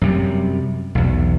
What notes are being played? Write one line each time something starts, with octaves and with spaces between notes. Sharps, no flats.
F#2 C3 G3
B1 E2